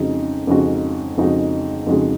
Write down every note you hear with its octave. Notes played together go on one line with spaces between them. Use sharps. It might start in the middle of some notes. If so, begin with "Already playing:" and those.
Already playing: F2 C#3 G#3 D#4 F#4
F2 C#3 G#3 D#4 F#4
F2 C#3 G#3 D#4 F#4
F2 C#3 G#3 D#4 F#4